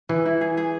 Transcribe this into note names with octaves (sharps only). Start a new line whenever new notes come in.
E3 G#4
E4
G#4
G#4